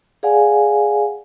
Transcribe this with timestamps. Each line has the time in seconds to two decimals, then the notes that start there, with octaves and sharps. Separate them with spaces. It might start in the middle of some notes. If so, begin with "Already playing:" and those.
0.23 G#4 D5 F5 F#5 G#5